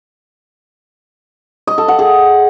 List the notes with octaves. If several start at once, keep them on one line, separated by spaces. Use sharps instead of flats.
D#5
A4
F#5
G#4